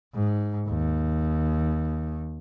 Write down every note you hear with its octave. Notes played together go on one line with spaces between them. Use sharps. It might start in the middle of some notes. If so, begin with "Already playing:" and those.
G#2
D#2